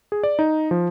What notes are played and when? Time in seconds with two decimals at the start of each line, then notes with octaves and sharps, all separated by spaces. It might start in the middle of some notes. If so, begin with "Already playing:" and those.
0.12 G#4
0.23 D5
0.39 D#4
0.71 F3